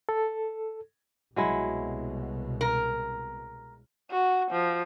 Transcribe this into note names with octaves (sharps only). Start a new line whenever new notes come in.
A4
C2 B2 F#3 G#3 E4
A#4
F#4
F3